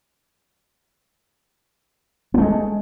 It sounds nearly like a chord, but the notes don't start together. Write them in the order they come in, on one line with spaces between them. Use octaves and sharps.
B3 A3 G#3